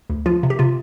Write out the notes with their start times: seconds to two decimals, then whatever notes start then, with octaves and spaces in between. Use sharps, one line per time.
0.10 D2
0.26 F3 F4
0.43 C3
0.50 G4
0.59 C3 F4